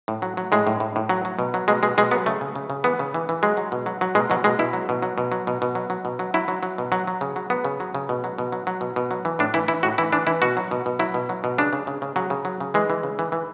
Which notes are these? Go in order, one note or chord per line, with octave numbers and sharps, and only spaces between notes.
A2
F#3
F#3
A2 G#3
A2
A2
A2
F#3
F#3
B2
F#3
B2 G#3
B2 G#3
B2 G#3
F#3 B3
C#3 A3
C#3
C#3
C#3
E3 B3
C#3
E3
E3
F#3 G#3
F#3
B2
F#3
F#3
B2 G#3
B2 F#3
B2 G#3
B2 E4
F#3
B2
F#3
B2
F#3
B2
B2
F#3
F#3
B2
F#3
F#3 E4
F#3
F#3
B2
F#3
F#3
C#3
F#3
F#3 B3
C#3
F#3
C#3
B2
F#3
B2
F#3
F#3
B2
B2
F#3
E3
A2 D4
E3 E4
E3 E4
A2 F#4
E3 E4
E3 D4
E3 E4
B2 F#4
F#3
B2
B2
F#3 E4
B2
F#3
B2
C#3 D4
C#3
C#3
C#3
C#3 F#3
C#3
F#3
C#3
E3 G#3
E3
C#3
E3
E3